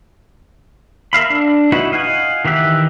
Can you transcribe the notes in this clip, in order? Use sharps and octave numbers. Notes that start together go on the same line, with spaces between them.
A#4 E5 F5 B5
D4
D#4 E4 F#4 B4
D#5 F5 F#5 G#5
D#3 E3 G4 E5 F#6